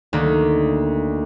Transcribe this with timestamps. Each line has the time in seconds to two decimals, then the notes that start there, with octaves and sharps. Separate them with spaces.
0.13 D2 D#3 A#3